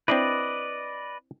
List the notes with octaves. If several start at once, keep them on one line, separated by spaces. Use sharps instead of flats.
C4 D4 E4 B4 D5 D#5